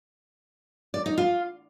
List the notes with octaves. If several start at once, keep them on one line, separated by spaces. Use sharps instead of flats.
D5
D#4
F4